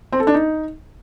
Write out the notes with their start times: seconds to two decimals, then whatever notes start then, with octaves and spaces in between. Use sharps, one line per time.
0.12 C4
0.20 A4
0.27 D4
0.34 D#4